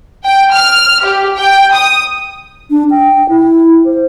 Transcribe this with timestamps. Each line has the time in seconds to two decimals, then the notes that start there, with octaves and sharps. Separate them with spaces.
0.25 G5
0.53 F6
1.03 G4
1.38 G5
1.74 D#6
2.70 D4
2.91 G5
3.29 E4
3.86 C5